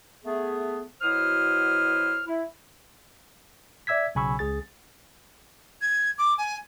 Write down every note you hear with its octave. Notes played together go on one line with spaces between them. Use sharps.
A3 B3 G#4
B2 F#3 E4 C5 D#6 F6
E4
D5 E5 E6 G#6 B6
B1 C#3 G#5 B5 C#6 E6
C#2 G#4 A6
G#6
D6
G#5